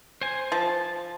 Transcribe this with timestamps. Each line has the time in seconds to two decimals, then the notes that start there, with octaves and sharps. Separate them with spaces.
0.21 C5 G#5
0.52 F3 A5